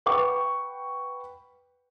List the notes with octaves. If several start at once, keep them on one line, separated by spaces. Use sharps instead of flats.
B4 F#5 G5 C#6